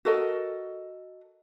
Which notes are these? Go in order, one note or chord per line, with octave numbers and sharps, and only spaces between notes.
F#4 A4 A#4 D#5